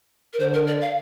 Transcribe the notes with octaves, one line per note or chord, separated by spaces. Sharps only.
A#4
D3 C5
A#4
D5
F5